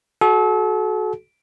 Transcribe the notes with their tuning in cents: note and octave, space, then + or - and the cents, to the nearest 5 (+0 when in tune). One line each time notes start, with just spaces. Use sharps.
F#4 +0 A4 -35